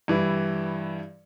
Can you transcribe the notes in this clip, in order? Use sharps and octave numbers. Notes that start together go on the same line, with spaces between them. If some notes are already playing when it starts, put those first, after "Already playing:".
G2 E3 G3 E4